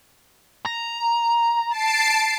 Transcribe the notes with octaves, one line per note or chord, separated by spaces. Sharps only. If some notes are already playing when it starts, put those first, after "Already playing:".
A#5
A5 C7 D7